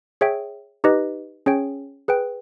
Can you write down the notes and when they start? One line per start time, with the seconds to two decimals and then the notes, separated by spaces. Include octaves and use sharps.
0.21 G#4 C#5 E5 G5
0.84 D#4 G4 B4 D#5
1.46 C#4 G#4 C#5 G5
2.08 G#4 B4 G5